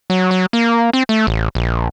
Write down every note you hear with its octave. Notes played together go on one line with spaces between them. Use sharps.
F#3
F#3
A#3
C4
A3
A1
A#1